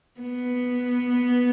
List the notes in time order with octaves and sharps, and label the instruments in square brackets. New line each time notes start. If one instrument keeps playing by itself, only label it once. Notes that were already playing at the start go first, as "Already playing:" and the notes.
[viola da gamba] B3